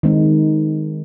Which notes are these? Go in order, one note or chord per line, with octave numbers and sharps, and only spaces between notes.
D#3 G#3 C4 D#4